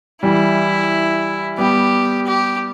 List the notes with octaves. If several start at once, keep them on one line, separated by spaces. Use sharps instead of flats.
E3 G3 E4
G3 B3 G4
G4